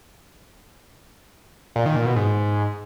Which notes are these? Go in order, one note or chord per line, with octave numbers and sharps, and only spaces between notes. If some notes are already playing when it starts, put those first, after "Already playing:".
A#2
D#3
A#2
B2
G#2